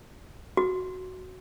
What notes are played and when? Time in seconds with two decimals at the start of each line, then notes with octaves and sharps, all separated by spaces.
0.57 F#4